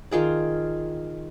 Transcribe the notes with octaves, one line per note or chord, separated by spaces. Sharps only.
D#3 F4 G#4 D5